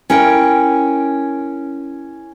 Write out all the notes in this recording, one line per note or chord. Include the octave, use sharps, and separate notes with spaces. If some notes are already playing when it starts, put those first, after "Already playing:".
C#4 E4 A#4 G5